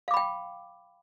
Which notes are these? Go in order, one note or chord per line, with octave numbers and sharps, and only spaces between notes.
F5 G5 B5 D6